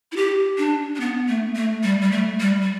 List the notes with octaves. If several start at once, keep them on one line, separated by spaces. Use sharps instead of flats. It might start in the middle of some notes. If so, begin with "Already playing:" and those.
E4
G4
D4
D4
B3
A3
A3
G3
G3
A3
G3
G3